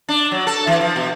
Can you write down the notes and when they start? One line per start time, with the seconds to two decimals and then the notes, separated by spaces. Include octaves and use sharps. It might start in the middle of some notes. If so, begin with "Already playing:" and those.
0.09 D4
0.31 F#3
0.47 A4
0.67 E3
0.81 F3
0.96 B2